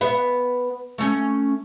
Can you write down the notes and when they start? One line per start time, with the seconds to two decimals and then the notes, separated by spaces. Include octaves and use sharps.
0.01 B3 E5
0.98 A3 C#4